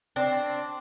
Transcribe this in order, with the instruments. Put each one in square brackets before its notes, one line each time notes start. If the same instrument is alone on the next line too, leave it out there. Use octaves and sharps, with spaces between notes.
[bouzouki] C4 D4